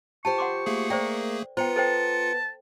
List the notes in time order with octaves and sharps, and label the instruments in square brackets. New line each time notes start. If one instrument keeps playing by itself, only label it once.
[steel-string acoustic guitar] F4 G4 C5 [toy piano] A5 [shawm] C#6
[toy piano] F#5 C6 D6
[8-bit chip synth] A3 A#3 G#4
[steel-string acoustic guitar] A#4 [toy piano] C5 D5 G5
[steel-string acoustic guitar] B3 A#5 [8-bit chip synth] F4 C#7 [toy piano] C5 G5
[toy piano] A4 C5 G5 [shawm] A5